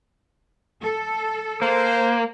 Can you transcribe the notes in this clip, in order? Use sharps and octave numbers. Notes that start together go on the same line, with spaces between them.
A4
A#3 C5